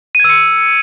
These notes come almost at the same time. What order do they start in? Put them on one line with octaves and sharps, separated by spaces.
D#7 G#6 E6 C#7